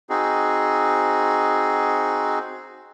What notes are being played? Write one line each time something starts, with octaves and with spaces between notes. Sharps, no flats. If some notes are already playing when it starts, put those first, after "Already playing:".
C4 D#4 F#4 G#4